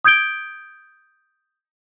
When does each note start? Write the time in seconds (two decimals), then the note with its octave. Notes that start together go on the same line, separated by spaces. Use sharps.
0.04 D#6 G6 G#6 D7 G7